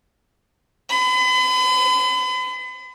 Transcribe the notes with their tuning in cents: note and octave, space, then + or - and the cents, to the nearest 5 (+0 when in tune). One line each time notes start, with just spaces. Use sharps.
B5 +40